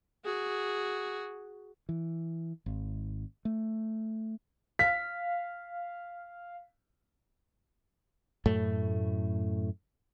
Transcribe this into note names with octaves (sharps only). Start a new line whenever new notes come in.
F#4 G#4
E3
G#1
A3
F5 B6
F#2 A2 A3